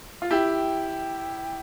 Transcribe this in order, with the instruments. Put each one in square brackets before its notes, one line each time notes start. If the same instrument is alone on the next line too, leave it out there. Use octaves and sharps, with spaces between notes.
[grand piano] F4
[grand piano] E4 G4 [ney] G5